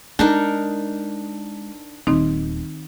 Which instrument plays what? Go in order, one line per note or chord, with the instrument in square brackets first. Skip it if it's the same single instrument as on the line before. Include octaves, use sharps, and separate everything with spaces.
[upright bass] G#3 [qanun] D4 D#4 A#4
[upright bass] D#1 [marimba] D#3 C4 D#4